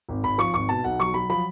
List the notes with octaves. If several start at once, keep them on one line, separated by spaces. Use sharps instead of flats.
G#1
G#1 B5
F3 C#6
G#1 C#6
B2 A5
B1 F#5
F#3 C#6
F#3 B5
F3 B5